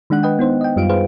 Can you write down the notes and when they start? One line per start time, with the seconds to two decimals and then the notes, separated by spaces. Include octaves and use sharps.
0.10 D#3 G#3 D4 F#5 F#6
0.23 B4 D#5 G5
0.39 B3 D#4 C5
0.61 D#5 G5
0.76 F#2 G3 F4 F5 D7
0.89 G#4 B4 C5 F5